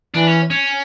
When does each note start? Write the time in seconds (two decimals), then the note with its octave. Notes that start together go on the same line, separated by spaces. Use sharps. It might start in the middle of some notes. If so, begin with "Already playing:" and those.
0.14 E3 D4
0.27 C#4
0.50 C#4